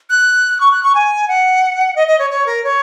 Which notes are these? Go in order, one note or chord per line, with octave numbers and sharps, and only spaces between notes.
F#6
C#6
F#6
C#6
G#5
F#5
D#5
D#5
C#5
C#5
A#4
C#5